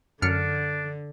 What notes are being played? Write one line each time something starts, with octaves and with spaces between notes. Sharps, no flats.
F#2 D3 D4 F6 C#7